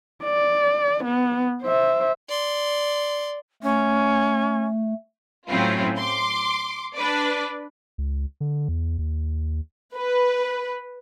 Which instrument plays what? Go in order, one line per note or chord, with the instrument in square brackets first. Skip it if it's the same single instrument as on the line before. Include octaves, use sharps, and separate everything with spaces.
[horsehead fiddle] D5
B3
C5 E5
[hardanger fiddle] D5 C6
[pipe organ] A3 [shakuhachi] C#4
[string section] A2 F#3 C4 C#4 E4 F4
C6 D6
D4 B4 D5
[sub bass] C#2
D3
E2
D#2
[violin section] B4